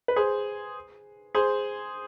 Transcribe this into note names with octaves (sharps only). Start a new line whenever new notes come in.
B4
G#4 C5
G#4 C5